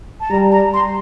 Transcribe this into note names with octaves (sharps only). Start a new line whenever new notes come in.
A5
G3 A#5
A#5
C6